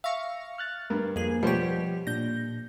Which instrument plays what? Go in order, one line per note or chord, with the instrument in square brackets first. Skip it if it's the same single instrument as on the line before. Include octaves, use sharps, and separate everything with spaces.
[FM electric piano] E5 A#6 C#7 [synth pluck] F5 C#6
[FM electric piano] F6 F#6 A6
[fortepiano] G2 [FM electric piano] A#4
[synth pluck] F2 G#4 [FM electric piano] A#3
[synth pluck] B2 G4 [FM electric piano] F3 [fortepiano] G3 C5 C#5
[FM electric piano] A#2 D4 G6 [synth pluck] A#6